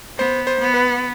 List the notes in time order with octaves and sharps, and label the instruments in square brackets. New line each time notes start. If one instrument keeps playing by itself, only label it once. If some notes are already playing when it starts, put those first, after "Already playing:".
[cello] B3 [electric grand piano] C5
[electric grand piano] C5
[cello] B3
[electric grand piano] B4